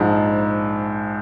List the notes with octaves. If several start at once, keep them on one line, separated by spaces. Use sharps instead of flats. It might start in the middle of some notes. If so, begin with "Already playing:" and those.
Already playing: A#1 G#2 F3